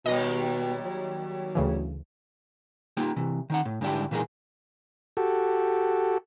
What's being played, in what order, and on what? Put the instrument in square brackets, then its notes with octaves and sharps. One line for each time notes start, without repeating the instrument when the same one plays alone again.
[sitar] D#2 D#3 G3 [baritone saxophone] B2 [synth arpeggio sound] D#5 A#6
[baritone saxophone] F#3
[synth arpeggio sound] D2 C#3 E3
[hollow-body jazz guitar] A#3 D#4 F4 G4
C3 E3
D#3 D#4 F#5
A2
G#2 D3 G3 D4 E4 G4
A#2 E3 G#3 A#3 D#4 G#4
[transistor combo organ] F#4 G4 A4